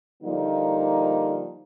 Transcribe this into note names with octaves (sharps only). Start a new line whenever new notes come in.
D3 F3 G3 A#3 D#4